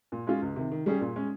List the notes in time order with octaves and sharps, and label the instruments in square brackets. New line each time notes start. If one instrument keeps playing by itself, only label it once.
[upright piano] A#2
G#3 C#4 F4
C#2
C3 D#3
D#3
G3 C#4 G#4
A#2
G#3 C#4